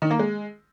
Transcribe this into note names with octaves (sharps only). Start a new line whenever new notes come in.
D#3
A#3
G#3